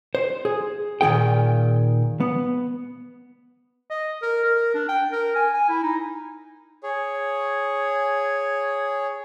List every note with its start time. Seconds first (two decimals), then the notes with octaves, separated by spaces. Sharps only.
0.15 C5
0.45 G#4
1.01 A#2 D#3 A#3 G#4 G5
2.20 B3
3.90 D#5
4.22 A#4
4.44 A#4
4.74 D4
4.89 G5
5.12 A#4
5.35 G#5
5.54 G#5
5.69 E4
5.83 D#4
6.83 G#4 C#5